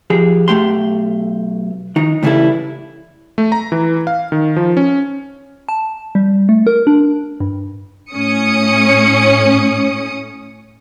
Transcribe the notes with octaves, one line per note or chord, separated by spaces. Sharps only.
F3 G4 G#4
B1 A3 G4 C6
D#3 D#4
A2 C#3 E3 G3 E4 A4
A3
A#5
E3
F5
D#3
F3
C#4
A5
G3
A3
A#4
D4
G2
A2 C#4 D#6 C#7